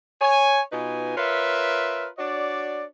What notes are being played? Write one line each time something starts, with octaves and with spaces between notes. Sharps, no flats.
C#5 G#5
B2 D#4 F4 B4 G#5
F4 A#4 B4 C#5 E5
D4 F#4 C#5 D5